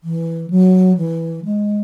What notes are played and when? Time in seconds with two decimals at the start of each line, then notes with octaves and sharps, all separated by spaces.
0.04 E3
0.50 F#3
0.97 E3
1.45 G#3